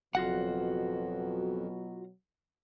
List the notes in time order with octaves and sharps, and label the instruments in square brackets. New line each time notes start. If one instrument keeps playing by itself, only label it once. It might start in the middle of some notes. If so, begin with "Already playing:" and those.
[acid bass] F#1 [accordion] F2 [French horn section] B2 F#3 [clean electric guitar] F4 F#4 F#5